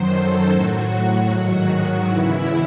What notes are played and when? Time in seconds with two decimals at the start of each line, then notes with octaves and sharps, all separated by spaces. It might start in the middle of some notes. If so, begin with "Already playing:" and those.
Already playing: F#2 D#3 F#3 C5
0.10 A4
0.49 A2 F#3 F#4
1.29 G#2 D#3 F#3 F#4
1.68 F#4
2.07 E2 C#3 E3 E4